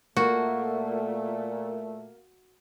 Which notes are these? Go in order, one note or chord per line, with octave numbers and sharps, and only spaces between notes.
A#2 A3 A#3 F#4